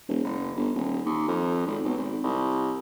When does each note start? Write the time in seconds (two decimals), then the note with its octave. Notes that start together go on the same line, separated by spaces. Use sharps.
0.08 E1
0.24 F#1
0.56 G1
0.75 D#1
1.06 D#2
1.28 F2
1.66 G#1
1.84 B1
1.98 G#1
2.24 C2